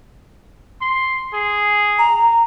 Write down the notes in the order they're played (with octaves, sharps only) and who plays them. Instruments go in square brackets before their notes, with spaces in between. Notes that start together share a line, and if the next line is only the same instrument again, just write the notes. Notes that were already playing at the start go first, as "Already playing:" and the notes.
[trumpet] C6
G#4
[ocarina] A#5